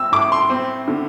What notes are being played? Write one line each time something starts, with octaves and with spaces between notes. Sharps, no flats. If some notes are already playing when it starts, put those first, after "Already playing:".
Already playing: C4 E6
A2 D6
C6
C4
D3